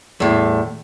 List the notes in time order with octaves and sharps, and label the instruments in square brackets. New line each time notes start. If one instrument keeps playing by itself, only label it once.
[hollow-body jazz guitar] E2 A2